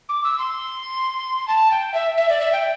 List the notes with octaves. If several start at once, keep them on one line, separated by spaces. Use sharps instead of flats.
D6
E6
C6
A5
G5
E5
E5
D5
E5
G5